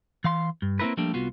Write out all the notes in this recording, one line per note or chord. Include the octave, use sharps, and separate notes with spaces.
E3 F5 C6
G2
A#3 C4 D4 E4 A#4 B4
F3 G3 A3 A#3 D4
C2 B3 F4 F#4